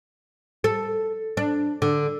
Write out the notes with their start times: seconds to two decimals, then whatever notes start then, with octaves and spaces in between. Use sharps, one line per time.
0.64 A4
1.37 D4
1.82 D3